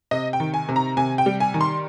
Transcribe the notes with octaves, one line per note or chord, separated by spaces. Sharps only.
C3 D#5
G5
D#3
G#5
C3
A#5
C3 G#5
G5
G3
G#5
D#3
C6